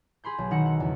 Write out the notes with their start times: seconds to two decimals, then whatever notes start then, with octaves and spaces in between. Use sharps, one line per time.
0.24 G#4 B5 C6 G6
0.38 B1
0.51 D#3 D#4 F#5 E6 C#7
0.66 F#5
0.80 E2 C#3